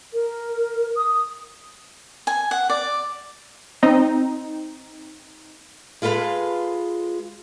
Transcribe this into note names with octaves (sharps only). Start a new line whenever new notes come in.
A#4
D#6
G#5
F#5
D5
C4 D#4
G#3 F4 A4 B4 F5